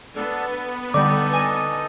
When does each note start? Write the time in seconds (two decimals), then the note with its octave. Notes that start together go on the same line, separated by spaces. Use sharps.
0.16 B3 D4 A4
0.52 B4
0.94 D3 G3 D#4 A4 D#5 D6
1.33 G#5